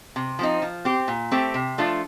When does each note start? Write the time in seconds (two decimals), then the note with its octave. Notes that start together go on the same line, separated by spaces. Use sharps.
0.16 C3
0.39 F3 C4 D#4
0.62 F3
0.85 C4 G4
1.08 A#2
1.32 A3 C4 G4
1.54 C3
1.78 F3 A3 D4 F4